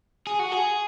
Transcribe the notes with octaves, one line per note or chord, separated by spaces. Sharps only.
G#4
F#4
G#4